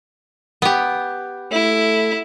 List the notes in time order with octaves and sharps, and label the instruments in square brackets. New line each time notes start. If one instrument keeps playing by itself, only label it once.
[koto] B3 G4
[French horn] A3 [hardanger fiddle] E4